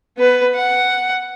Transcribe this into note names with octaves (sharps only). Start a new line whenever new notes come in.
B3 B4
F#5